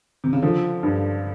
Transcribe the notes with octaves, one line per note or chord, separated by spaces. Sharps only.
C3
C#3
D3 F3
G2